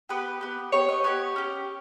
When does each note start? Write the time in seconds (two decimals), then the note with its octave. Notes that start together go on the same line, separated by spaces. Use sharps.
0.09 B3 G4 B4
0.41 B3 G4
0.72 B3 G4 C#5
0.89 D#5
1.04 B3 G4 C#5
1.36 C#4 G4